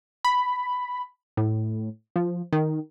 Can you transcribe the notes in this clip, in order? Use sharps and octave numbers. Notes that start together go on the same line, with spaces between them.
B5
A2
F3
D#3